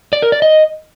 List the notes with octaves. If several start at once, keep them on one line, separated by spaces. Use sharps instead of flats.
D5
A#4
D5
D#5